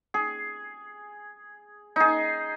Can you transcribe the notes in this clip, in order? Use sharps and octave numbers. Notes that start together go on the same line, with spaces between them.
G#4
D#4 G#4